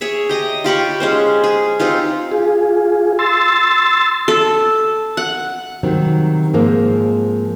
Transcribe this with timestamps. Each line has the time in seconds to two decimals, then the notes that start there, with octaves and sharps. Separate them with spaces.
0.01 G#4 C#5 E5
0.29 G4 D#5 A#5
0.64 F4 G4 B5 C#6
1.00 G#3 C#4 C5
1.44 G#4
1.79 C4 D#4 F4 G4
2.32 F4 G#4
3.19 C6 E6 A6
4.28 A4
5.17 F#5
5.83 C3 D#3 F#3 G3 C4
6.53 G#2 F3 G#3 A#3 C4